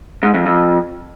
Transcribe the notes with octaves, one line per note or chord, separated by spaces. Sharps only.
G#2
F2
F2